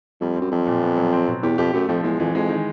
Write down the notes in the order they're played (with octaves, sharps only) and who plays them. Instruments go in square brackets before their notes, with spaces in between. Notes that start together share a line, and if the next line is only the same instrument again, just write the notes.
[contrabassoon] F2 [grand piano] G3
[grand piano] C4
[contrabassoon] F#2
[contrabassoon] F2 [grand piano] F#3
[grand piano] A#2
B3
F#3
C4
B2
[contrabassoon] E2 [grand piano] G4
[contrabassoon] F2 [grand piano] G4
[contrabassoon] F#2 [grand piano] A3
[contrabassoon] F2 [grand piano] F3
[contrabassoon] E2 [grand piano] G#3
[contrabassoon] F2 [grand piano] E3
[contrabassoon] F2 [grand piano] G#3
[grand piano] D#3